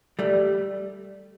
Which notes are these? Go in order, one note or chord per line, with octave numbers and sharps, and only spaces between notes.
G3 A3